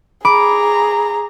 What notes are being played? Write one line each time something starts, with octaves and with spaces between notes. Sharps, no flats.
G#4 A#5 B5 D6